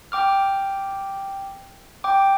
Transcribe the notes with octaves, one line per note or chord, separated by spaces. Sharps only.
G5 D6 F6
G5 D6